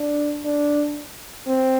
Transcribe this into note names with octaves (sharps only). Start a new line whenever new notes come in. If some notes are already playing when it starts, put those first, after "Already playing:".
Already playing: D4
D4
C4